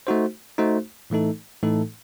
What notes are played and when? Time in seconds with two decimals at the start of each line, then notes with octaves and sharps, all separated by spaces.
0.07 A3 D#4 F#4 C5
0.58 A3 D#4 F#4 C5
1.10 A2 E3 A3 D#4 A4
1.63 A2 E3 A3 D#4 A4